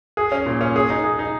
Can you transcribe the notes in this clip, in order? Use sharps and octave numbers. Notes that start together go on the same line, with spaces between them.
G#4
C#4
A#2
C#4
G#4
D#4
G#4
D#4